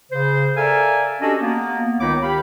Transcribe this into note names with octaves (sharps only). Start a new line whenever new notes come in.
C#3 C5
A4 A#4 D5 E5 F5 G#5
C#4 D4 F#4 G4 A4 D#5
A#3 B3
C#2 D#3 D#4 C#5 B5 D6
D#3 G4 F5 G5 B5